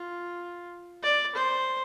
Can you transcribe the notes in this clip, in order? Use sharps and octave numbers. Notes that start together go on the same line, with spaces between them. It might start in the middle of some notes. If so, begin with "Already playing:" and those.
Already playing: F4
D5
C5